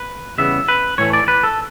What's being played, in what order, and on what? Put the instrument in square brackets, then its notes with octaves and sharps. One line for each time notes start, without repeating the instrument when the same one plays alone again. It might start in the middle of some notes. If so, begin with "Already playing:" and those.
Already playing: [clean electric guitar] B4
E2 C#3 G3 B3 E5
B4
A2 E3 A3 C#5
D5
B4
A4